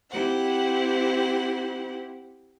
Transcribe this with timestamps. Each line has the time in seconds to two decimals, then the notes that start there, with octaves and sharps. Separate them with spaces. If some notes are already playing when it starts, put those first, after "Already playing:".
0.11 C4 E4 G4 C5 F#5